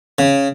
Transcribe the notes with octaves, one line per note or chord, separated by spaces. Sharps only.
C#3